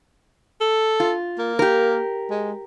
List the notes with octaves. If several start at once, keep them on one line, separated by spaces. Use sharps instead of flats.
A4
F4
A#3
G4 A#4
G#3